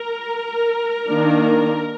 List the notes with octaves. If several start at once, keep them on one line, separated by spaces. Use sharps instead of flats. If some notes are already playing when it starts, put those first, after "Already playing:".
Already playing: A#4
D#3 A#3 D4